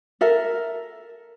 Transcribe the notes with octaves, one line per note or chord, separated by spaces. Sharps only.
A4 A#4 E5